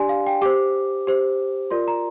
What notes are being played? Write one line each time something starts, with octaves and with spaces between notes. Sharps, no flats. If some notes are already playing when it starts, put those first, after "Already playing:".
Already playing: D4 G4 D5 G#5 C6
F5
G5
G4 C5 D6
G4 C5
F4 A#4 D5 C6
A#5